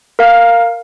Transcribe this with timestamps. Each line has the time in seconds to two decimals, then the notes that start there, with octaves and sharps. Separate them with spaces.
0.19 A#4 F5